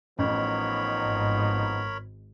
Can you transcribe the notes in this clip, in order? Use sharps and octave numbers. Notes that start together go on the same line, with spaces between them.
A1 F3 B3 D#4 A#4 C#5 B5
G#1 G#2